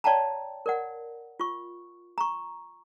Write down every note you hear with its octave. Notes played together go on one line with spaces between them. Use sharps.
C#5 D5 F5 G5 A5 A#5
A#4 D5 F#5
F4 C#6
A#5 C#6